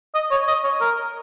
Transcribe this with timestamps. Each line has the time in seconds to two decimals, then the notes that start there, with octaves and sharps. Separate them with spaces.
0.14 D#5
0.31 C#5
0.48 D#5
0.64 C#5
0.81 A#4